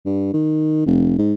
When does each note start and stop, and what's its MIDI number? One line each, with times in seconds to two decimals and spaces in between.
0.05 0.32 43
0.34 0.86 51
0.87 1.15 29
1.19 1.34 44